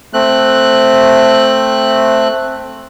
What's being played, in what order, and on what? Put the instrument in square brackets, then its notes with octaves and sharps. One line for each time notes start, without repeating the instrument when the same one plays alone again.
[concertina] A3 C4 F#6